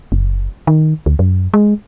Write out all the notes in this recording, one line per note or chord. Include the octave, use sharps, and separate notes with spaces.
F#1
D#3
D2
F#2
G#3